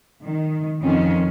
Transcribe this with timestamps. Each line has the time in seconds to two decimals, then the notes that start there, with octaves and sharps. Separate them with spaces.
0.22 D#3
0.82 F2 D#3 C#4